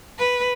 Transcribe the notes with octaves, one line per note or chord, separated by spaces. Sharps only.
B4